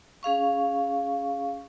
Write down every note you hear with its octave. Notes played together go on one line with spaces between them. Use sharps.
C#4 G#4 F5 C#6